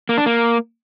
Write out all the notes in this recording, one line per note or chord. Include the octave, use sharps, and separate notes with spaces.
A#3
D4
A#3